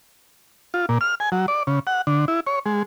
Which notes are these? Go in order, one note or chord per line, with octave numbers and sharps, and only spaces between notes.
F4
A#2
F6
G#5
F#3
D5
C#3
F#5
D3
E4
C#5
G#3